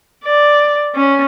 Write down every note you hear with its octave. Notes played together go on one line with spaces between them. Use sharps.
D5
C#4